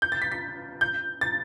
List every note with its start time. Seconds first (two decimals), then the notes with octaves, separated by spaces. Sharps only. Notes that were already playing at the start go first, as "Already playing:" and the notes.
0.02 G6
0.12 A6
0.22 B6
0.32 B6
0.81 G6
1.21 A6